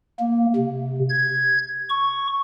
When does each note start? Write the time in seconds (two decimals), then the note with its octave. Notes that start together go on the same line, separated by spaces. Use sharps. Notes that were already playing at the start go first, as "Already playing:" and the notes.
0.19 A#3
0.56 C3
1.10 G#6
1.90 C#6